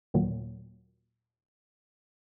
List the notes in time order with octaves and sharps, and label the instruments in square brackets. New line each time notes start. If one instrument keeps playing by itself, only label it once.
[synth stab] D#2 A#2 F#3